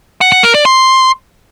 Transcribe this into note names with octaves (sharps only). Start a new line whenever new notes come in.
F#5
F#5
A#4
D5
C6